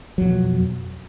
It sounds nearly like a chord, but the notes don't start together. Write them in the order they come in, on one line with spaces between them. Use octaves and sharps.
F#3 F2 B2